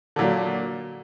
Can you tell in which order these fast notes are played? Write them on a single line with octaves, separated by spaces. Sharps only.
D3 A#2 F#3